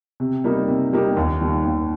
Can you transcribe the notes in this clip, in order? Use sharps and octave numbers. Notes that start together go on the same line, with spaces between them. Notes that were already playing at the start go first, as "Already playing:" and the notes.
C3
G3 A#3 D#4 G4
C3
G3 A#3 D#4 G4
D#2
D#3 G3
D#2